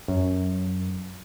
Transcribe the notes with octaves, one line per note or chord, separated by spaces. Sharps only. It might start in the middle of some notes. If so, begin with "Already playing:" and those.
F#2